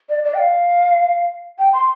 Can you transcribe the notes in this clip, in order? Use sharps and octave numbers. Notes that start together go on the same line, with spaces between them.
D5
D5
G5
F5
G5
C6